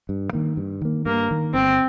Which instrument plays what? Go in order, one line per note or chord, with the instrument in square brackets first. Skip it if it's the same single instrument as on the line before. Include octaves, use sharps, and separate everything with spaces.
[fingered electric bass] G2
D#3 A#3
G2
D#3 A#3
[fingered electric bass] G2 [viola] A#3
[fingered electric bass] D#3 A#3
[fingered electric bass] G1 [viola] C4